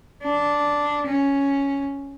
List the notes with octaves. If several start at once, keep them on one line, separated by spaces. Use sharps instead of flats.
D4
C#4